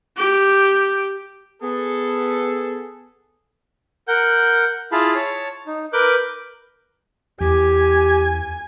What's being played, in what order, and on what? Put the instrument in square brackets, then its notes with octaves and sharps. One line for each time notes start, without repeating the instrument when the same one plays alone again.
[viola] G4
[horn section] B3 G#4 A4
[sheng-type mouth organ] A#4 F#5 G6
E4 F4 G#4 F5 A5 B5
C#5 A5
D#4
A#4 B4 D6 F#6 G6
[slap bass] E2 [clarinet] G4 [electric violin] G#5